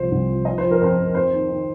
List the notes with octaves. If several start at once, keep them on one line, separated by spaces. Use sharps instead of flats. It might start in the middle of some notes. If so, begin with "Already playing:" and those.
Already playing: C2 F3 C5
C2
F3
F3 D#5
C5
F3
A#4
F2 C5
F2
F2 C5
D#3
D#3